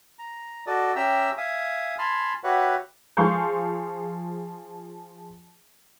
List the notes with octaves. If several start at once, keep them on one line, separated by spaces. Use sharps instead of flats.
A#5
F#4 A4 D5 D#5
C#4 G4 E5 G5 A#5 E6
E5 F5 G#5 D#6
G#5 A5 B5 C6 F6
F#4 G4 B4 C#5 E5 F#5
F3 G#4 F5 C6 C#6 G6